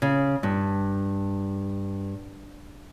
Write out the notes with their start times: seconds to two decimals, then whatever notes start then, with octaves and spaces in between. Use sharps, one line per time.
0.02 C#3
0.43 G2